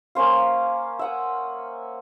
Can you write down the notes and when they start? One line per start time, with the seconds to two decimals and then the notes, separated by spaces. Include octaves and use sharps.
0.15 A#3 C#4 C5 F5
0.99 E5 F#5 D#6